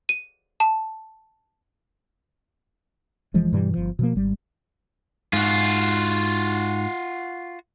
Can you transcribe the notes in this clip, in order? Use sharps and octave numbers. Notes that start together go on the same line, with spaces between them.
D#7
A5
F1 E3 F3 G#3
G2 B2 E3 G3
G1 F3
B2 F3 A#3
G#1 G3
G#2 F4 F#4